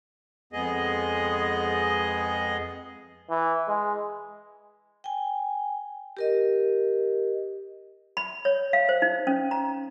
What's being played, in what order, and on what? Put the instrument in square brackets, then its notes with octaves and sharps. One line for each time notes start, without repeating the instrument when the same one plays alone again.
[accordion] F2 G#3 B3 G#4 D#5
[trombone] E3
G#3
[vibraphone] G5 G#5
G4 A#4 D#5
[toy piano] B5
C#5
F5
C5
D#4
C#4
A#5